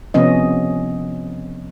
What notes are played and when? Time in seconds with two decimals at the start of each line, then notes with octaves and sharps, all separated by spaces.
0.14 C3 F3 B3 C#4 D#5